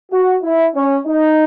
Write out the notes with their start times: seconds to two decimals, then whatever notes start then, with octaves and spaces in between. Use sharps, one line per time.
0.10 F#4
0.42 E4
0.74 C#4
1.06 D#4